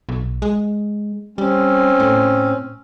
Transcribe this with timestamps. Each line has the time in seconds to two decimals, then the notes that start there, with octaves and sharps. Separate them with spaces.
0.09 B1
0.42 G#3
1.38 G3 C4 C#4
2.00 A2